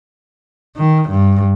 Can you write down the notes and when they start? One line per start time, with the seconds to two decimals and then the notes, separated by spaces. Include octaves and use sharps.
0.76 D#3
1.09 G2